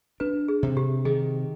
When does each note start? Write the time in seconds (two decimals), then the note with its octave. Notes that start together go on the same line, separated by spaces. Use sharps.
0.20 D4 B4
0.48 G#4
0.63 C3
0.77 G4
1.05 D#3 G#4